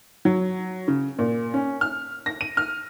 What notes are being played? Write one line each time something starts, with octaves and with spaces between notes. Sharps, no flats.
F#3
C#3
A#2
C#4
F6
A#6
D#7
F6